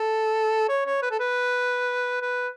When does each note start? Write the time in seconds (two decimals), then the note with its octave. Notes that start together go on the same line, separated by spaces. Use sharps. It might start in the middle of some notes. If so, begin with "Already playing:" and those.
Already playing: A4
0.68 C#5
0.86 C#5
1.02 B4
1.11 A4
1.20 B4
2.22 B4